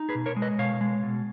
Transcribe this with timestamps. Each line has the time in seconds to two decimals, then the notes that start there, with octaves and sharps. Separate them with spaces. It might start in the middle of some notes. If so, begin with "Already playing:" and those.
Already playing: D#4
0.09 G#4 B4
0.15 B2
0.26 A#4 C#5
0.36 G#3
0.42 B4 D#5
0.59 B2 C#5 F5
0.81 G#3
1.03 B2